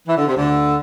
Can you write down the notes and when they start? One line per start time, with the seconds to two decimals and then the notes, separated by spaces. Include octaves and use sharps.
0.07 E3
0.17 D3
0.27 C3
0.36 D2 D3